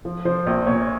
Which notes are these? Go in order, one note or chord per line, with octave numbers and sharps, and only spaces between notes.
F3
F3 C5
A#1 C5
A#2 C#5